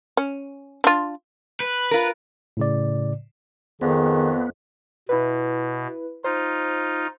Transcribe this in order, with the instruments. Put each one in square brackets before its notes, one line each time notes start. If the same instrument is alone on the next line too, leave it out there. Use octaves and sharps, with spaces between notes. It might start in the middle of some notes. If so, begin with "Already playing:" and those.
[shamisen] C#4
D4 F4
[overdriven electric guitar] B4
[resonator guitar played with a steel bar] F4 A#4
[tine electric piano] A2 C#3 D5
[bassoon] F2 [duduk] D#3 [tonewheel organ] B3 [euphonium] G#4
[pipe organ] B2 [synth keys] E4 B4
[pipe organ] D#4 F4 [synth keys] C5